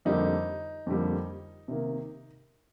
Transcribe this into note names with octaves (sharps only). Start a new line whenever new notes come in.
F2 D3 G3 A#3 D#4
F2 D3 G3 A#3
C3 D#3 A#3